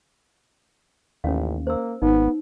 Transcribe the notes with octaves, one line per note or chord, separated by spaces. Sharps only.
A1 D#2 C#4 F5
A#3 C5 E6
G#1 B3 D#4